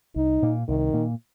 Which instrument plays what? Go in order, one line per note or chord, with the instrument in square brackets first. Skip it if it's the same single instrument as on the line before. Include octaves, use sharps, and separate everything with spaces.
[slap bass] C2 [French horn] D#4
[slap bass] A#2 A#3
[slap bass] C2 [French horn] D#3
[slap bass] A#2 A#3